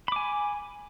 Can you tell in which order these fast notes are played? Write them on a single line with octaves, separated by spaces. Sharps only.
B5 D6 G#5